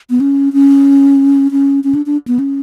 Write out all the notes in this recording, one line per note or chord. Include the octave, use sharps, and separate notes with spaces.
B3
C#4
C#4
C#4
C#4
D4
D4
B3
C#4